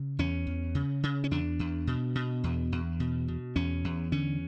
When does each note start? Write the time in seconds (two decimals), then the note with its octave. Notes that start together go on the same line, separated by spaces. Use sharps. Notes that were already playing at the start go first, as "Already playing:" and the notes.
Already playing: C#3
0.19 E2 C#4
0.47 E2
0.75 C#3
1.03 C#3
1.24 C#4
1.31 E2 D4
1.59 E2
1.87 B2
2.15 B2
2.44 E2
2.72 E2
3.00 B2
3.28 B2
3.56 E2 C#4
3.84 E2
4.12 D3 C#4